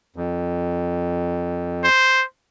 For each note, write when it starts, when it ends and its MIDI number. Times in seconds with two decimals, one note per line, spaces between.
0.16 1.88 41
1.84 2.24 72